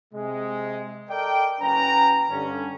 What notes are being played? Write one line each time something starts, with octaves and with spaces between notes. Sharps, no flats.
C3 G#3
A4 A#4 D5 D#5 G5
F#1 F#3 C#4 B4 G5 A#5
G2 D3 C#4